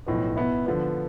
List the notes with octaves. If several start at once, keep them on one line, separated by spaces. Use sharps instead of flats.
B1 A2 F3 B3
B2 B3 E4
D3 F3 B3